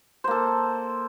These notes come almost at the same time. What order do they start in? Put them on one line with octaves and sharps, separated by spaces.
C5 A#3 A4